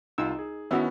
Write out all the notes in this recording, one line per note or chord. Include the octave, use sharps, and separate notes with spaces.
C2 D#4 F4 E6
G#4
D#3 B3 C#4 E4 F#4 E5